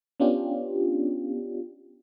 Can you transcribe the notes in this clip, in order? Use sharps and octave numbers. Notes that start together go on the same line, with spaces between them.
B3 C#4 D4 F4 G4